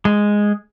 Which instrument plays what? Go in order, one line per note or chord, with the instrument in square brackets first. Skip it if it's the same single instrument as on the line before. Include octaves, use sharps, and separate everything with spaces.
[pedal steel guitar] G#3